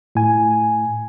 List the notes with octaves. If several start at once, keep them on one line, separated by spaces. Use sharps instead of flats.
A2 G#5